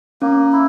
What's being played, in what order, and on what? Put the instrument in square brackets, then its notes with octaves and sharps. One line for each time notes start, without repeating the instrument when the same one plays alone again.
[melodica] A#3 [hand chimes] C#4
[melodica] E4